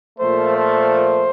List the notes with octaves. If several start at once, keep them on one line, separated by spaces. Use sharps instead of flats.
A#2 F3 A3 C5
C5